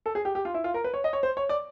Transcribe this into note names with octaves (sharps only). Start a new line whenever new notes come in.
A4
G#4
G4
G4
F4
E4
F4
A#4
B4
C#5
D#5
C#5
C5
C#5
D5